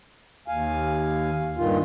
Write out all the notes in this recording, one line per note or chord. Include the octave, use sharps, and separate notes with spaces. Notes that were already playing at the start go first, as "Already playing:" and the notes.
D#2 F5 G#5
G2 A#2 D#3 F4